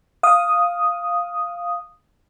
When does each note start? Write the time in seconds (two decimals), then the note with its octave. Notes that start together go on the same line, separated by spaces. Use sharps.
0.23 F5 D#6